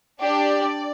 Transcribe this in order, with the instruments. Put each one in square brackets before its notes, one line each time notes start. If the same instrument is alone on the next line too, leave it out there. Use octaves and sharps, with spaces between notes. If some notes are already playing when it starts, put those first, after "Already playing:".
[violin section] D4 G4 D5